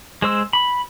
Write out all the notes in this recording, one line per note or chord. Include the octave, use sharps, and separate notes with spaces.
G#3 C5 E6
B5